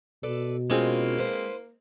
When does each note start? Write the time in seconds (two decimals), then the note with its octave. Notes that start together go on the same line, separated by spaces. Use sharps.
0.23 B2 A4 B4 D5
0.70 G#3 A#3 C4 C#4 E4 F4
1.18 B4 C5